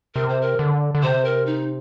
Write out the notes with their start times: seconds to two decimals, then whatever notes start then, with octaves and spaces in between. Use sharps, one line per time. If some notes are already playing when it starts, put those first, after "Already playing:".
0.15 C3 A#4
0.29 C5
0.42 A#4
0.59 D3
0.95 D3
1.03 C3 C5
1.25 A#4
1.46 D#4